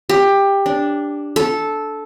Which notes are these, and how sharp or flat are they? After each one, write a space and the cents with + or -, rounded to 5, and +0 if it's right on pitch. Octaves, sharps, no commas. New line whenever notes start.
G4 +15
D4 -5
A4 -10